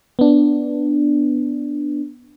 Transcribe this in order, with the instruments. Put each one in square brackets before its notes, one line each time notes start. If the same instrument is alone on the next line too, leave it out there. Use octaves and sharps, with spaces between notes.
[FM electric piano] B3 D4